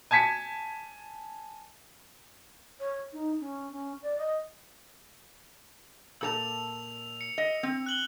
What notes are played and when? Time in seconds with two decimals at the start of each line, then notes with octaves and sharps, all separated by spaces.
0.11 G#5 A5 G#6 B6 C#7
2.80 C#5
3.13 D#4
3.40 C#4
3.72 C#4
4.02 D5
4.19 D#5
6.21 A#2 A4 A5 E6 F7
7.21 C#7
7.38 D#5
7.63 C4
7.86 F#6 F#7 G7